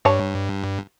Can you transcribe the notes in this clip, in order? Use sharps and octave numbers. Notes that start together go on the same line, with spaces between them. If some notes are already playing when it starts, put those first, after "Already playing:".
G2 G3 C#5 A5